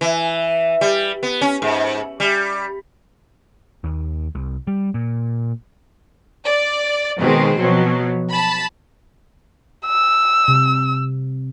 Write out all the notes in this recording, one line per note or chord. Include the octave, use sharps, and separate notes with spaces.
E3
G3
B3
C#4
G#2
G3
D#2
C2
G3
A#2
D5
B2 D#3 G#3 C4
B2 F3 F#3
A5 B5
E6
C3